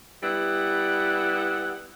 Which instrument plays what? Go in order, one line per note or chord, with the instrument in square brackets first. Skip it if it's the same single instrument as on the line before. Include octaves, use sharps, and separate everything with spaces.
[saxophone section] G3 B3 E4 F#5